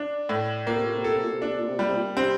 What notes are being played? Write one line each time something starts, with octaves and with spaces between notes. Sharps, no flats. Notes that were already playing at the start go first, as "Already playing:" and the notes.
Already playing: D4
A2
A#2 A#3
C3
A#2
C3
A#2 A4
C3
A#2
C3
A#2 D4
C3
A#2
C3
A#2 G3
C3
A#2
C3 C4